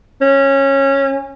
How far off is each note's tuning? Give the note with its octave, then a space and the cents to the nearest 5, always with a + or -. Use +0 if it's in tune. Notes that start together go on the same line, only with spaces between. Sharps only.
C#4 -15